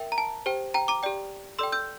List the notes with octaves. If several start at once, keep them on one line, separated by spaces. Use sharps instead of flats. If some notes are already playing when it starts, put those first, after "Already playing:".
Already playing: A#4 E5 G5
A#5
A5
G4 C5 G5
G5 A#5
A#5 D6
G4 D5 G5
A4 D5 G5 C6 E6
E6 G6